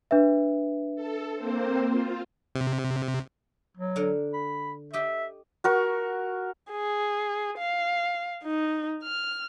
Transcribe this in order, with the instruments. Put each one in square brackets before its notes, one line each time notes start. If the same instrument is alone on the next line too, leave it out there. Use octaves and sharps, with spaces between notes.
[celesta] D4 B4 E5
[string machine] A4
A#3 C4 C5
F4
[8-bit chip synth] C3
[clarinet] F#3
[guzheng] D3 A#4
[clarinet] B5
[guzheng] G4 D#5 [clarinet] E5
[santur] F#4 A#4 C#6
[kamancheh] G#4
F5
D#4
F6